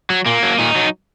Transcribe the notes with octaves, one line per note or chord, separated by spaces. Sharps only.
F#3
A#2 A#3
F#3
A#2 D#4
F#3